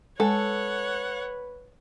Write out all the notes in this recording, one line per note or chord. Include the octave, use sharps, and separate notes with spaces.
G#3 A4 B4 C#5 F#5 G#5